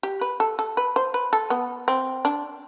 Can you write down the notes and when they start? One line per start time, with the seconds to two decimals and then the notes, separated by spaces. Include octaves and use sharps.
0.03 G4
0.21 B4
0.40 A4
0.59 A4
0.77 B4
0.96 C5
1.14 B4
1.33 A4
1.50 B3
1.88 C4
2.25 D4